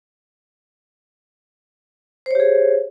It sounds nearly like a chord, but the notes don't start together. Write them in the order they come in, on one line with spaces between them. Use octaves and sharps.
C5 C#5 G4 G#4